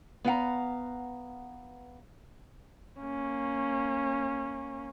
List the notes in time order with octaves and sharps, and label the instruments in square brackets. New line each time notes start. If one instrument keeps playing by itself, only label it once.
[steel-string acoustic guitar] B3 F5 F#5 A#5
[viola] A#3 C#4